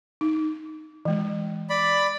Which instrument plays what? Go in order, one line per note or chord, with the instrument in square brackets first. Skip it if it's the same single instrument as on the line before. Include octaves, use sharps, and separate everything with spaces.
[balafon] D#4
E3 G#3
[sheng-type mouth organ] D5 B5